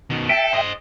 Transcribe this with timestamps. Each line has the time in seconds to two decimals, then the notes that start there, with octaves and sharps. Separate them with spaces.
0.10 B2 D#3
0.29 A4 E5 G5
0.53 C5 D#5